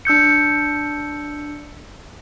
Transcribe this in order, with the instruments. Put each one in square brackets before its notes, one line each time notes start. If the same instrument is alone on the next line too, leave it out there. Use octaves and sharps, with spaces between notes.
[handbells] D4 E6 G6 C#7